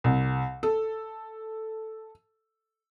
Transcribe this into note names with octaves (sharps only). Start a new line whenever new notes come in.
C2
A4